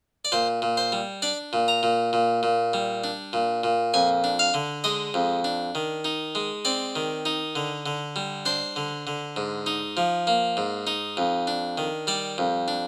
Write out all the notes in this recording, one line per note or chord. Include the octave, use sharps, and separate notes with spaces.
D5
A#2 C5
A#2
C5
G3
D4 D5
A#2
A#5
A#2
A#2
A#2
G3
D4
A#2
A#2
F2 G#5
D4
F5
D3
G#3 D#5
F2
D4
D#3
D#4
G#3
C4 D5
D#3
D#4
D3
D3
G3
D4 C5
D3
D3
G#2
D#4
F3
A#3
G#2
D#4
F2
D4
D#3
G3 D5
F2
D4